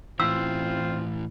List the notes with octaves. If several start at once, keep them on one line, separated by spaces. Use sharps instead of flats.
A2 E3 C4 F4 E6